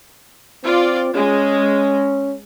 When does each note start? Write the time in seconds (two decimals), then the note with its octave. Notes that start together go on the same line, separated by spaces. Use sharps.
0.63 C4 F4 D5
1.15 G#3 C#4